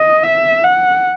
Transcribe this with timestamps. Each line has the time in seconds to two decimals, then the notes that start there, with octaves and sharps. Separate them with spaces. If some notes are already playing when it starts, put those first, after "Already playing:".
Already playing: D#5
0.23 E5
0.64 F#5